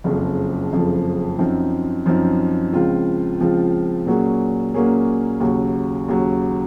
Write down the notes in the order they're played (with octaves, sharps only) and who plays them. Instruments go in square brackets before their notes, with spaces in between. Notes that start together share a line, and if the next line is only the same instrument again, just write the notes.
[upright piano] F#1 F2 C#3 F3
F#1 F2 C#3 F3
F#2 F3 C4 D#4
F#2 F3 C4 D#4
C#2 C#3 F3 C4 F4
C#2 C#3 F3 C4 F4
A#2 F#3 A#3 C#4 G#4
A#2 F#3 A#3 C#4 G#4
D#2 C#3 F#3
D#2 C#3 F#3